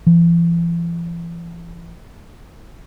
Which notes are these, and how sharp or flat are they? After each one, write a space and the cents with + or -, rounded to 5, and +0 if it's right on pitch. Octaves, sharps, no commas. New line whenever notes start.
E3 +45